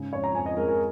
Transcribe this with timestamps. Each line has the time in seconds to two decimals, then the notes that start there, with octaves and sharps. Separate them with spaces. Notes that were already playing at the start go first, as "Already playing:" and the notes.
Already playing: G#2 C#3
0.13 F2 C#5
0.24 A#5
0.35 F2 G#5
0.46 D#5
0.57 G#3 A#4
0.68 A#4